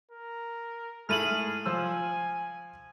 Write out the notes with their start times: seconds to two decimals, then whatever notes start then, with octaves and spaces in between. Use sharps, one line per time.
0.11 A#4
1.09 G#2 A3 E4 G#4 F6 D#7 F#7
1.66 F3 C5 G#5 E6